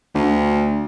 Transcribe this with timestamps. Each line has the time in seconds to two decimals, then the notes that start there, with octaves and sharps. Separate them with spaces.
0.15 D2